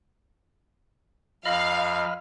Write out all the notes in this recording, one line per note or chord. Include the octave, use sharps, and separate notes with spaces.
F2 D#5 F5 B5 F6